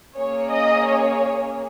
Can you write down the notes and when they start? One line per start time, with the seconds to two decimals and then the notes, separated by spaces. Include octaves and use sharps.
0.16 A#3 C#4 G#4 C#5
0.53 D#5
0.88 C#5